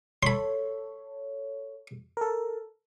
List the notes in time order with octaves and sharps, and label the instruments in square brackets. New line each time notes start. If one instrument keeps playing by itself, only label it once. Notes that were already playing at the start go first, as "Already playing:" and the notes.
[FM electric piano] A4 C#5 [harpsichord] B5 C6
[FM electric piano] A4 A#4